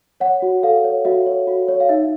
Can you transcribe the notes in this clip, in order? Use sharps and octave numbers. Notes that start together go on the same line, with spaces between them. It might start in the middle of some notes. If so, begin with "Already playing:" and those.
C#5 F#5
F#4
A4 F5
C#5
F#4 E5
C#5
F#4
C#5
F5
D#4 E5